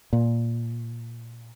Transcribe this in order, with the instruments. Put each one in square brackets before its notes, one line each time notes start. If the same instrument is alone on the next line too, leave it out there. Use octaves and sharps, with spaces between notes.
[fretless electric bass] A#2